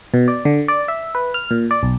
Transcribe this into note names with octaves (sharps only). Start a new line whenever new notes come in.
B2
D5
D3
D5
E5
B4
F6
A#2
D5
B1